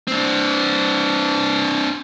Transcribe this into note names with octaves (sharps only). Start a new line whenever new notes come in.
C4 D4